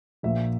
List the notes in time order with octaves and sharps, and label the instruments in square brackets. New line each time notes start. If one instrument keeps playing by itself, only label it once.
[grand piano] A#1 A#2 F3 A#3 E5